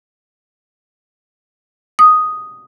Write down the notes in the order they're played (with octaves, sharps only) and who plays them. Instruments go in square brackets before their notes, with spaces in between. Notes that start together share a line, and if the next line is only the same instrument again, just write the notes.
[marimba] D#6